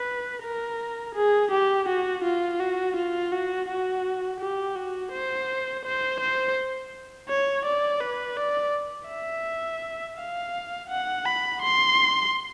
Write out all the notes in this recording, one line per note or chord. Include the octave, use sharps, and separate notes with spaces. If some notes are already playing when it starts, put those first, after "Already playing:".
Already playing: B4
A#4
G#4
G4
F#4
F4
F#4
F4
F#4
F#4
G4
F#4
C5
C5
C5
C#5
D5
B4
D5
E5
F5
F#5
B5
C6